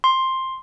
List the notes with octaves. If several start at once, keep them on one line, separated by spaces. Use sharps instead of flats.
C6